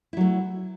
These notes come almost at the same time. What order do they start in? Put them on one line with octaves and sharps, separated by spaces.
E4 F#3 A3